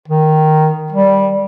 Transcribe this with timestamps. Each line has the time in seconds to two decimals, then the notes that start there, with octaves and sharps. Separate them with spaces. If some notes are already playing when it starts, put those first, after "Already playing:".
0.08 D#3
0.92 G3